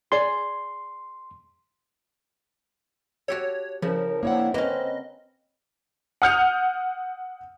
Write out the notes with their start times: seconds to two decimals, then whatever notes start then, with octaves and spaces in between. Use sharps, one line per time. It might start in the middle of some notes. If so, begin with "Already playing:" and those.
0.12 G#4 D5 C6
3.28 F#4 G4 A4 C#5
3.82 A2 C#3 F3 A#4
4.23 A#3 C4 D4 E4 C#5 F#5
4.54 A#3 C4 C#4 B4 D#5
6.22 F#5 D#6 F6 G6 C#7 F7